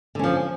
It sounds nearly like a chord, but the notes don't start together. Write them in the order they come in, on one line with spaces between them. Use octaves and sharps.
D3 C#4 F3